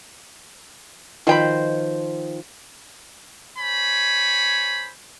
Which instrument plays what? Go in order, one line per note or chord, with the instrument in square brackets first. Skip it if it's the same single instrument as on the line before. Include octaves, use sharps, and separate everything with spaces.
[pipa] B2 G5 B5 [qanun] D#3 F3 C5
[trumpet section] C5 C#5 G#5 B5